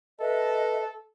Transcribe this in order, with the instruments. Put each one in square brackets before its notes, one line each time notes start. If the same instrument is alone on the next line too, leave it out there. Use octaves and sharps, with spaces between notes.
[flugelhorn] A4 [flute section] B4 D#5 E5